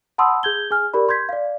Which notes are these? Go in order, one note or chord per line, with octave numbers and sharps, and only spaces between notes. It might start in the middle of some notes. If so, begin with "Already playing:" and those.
F#5 A5 B5 C6 D#6 E6
G#4 G6 G#6 G7
G#4 G#5 F6
G4 A#4 D5 B5
C6 G6 G#6 B6
D5 F5